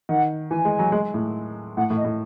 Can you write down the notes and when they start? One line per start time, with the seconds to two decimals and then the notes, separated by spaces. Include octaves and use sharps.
0.09 D#3 F#5
0.51 E3 G#5
0.65 G#3
0.79 F#3
0.92 G#3
1.14 A2
1.77 A2 F#5
1.90 A2
1.97 D#5
2.04 A2